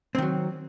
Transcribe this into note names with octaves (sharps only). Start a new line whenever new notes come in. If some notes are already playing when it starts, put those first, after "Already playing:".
D#3 F#3 C4